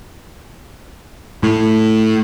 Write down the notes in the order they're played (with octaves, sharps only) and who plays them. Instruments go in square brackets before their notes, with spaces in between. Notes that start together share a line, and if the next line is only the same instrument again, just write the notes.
[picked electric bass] A2